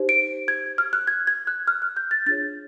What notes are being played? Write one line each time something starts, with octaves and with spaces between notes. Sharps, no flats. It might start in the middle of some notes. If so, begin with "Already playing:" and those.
Already playing: D#4 G4 C5
D7
G#6
F6
F#6
G#6
G#6
F#6
F6
F#6
G6
A6
D4 F4 G#4 C#5 A6